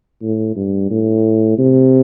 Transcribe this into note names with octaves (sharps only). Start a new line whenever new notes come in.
A2
G2
A2
C3